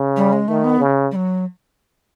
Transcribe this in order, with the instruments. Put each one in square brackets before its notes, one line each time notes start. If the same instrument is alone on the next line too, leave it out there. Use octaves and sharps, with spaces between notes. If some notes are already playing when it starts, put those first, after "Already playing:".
Already playing: [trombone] C#3
[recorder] G3
G#3
[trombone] D#3 [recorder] A3
[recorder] B3
[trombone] C#3
[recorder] G3
F#3